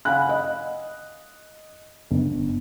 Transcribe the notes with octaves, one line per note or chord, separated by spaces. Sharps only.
F5 F#5 G#5 B5 F#6
D#5
G1